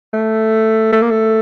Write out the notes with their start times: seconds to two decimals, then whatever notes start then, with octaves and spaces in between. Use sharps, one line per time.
0.14 A3
0.92 A3
1.02 A#3
1.10 A3